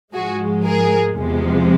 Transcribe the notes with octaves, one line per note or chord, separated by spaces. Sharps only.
G#2 F3 G#3 F#4 G#4
G#4 A#4
E2 C3 F3 G#3